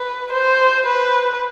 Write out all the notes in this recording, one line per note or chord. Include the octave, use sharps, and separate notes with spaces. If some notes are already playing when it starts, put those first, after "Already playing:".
Already playing: B4
C5
B4